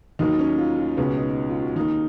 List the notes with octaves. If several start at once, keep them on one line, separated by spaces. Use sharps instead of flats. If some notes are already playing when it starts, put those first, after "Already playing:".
D#2 D#3 F#3 A#3 D#4
C#4
F4
F4
C#2 B2 G#3 B3 C#4
D#4
F4
F#4
D#2 D#3 A#3 D#4